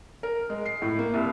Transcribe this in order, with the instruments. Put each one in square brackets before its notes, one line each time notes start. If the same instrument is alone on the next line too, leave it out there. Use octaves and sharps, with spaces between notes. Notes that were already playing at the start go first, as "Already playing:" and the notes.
[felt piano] A#4
G#3
C7
A2
A#3
C2